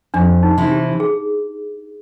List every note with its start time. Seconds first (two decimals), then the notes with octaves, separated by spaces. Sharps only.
0.14 F2 D4
0.43 D#4
0.58 C3 E3
0.72 G4
1.00 G#4